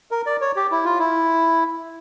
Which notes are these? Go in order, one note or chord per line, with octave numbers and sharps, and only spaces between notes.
A#4
D5
C#5
G4
E4
F4
E4